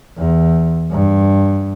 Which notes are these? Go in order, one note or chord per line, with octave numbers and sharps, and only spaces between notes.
E2
G2